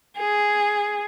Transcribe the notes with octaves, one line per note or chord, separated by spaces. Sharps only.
G#4